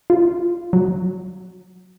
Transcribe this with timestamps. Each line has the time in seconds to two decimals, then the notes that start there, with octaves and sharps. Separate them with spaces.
0.10 F4
0.73 F#3